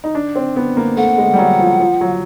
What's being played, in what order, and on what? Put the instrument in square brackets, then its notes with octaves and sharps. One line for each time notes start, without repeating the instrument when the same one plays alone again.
[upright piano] D#4
D4
C4
B3
A#3
[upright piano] A3 [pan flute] F#5
[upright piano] G#3
G3
F#3
F3
F3
F#3